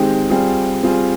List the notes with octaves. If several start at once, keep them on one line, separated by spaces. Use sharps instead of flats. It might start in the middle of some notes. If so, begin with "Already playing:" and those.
Already playing: D#3 G#3 C4 G4
G3 C4 F4 G#4
G3 C4 F4 G#4